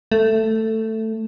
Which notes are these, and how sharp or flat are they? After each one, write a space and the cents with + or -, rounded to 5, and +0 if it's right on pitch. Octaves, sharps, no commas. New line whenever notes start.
A3 +10